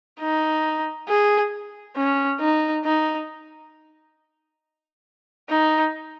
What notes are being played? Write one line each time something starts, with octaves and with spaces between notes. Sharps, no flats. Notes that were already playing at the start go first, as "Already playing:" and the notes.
D#4
G#4
C#4
D#4
D#4
D#4